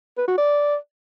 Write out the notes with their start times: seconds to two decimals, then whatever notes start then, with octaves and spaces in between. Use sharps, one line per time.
0.18 B4
0.28 F#4
0.38 D5